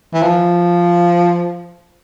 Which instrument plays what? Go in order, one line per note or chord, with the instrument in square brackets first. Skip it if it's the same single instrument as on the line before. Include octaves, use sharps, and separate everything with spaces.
[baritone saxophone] E3
F3